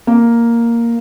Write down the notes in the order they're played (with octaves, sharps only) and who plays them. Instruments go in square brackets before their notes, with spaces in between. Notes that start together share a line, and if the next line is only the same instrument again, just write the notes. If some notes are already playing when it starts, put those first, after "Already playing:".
[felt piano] A#3